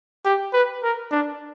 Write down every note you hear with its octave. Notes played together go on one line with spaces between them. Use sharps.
G4
B4
A#4
D4